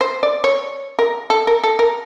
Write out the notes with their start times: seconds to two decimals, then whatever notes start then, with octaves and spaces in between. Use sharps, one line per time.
0.01 C5
0.23 D5
0.44 C#5
0.99 A#4
1.30 A4
1.47 A#4
1.64 A4
1.79 A#4